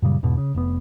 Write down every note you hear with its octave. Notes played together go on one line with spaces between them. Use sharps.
F#2 A#2 C#3 G3
E2 G#2 B2
C#3
F1 B3